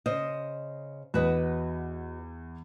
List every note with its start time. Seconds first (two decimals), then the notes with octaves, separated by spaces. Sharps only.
0.06 C#3 C5 D#5
1.14 E2 F#4 B4 D#5